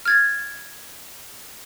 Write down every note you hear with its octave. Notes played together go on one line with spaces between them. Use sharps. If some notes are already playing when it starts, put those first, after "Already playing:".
F6 G#6 A6